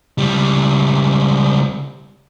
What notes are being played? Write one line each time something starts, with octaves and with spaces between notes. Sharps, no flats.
C#2 G3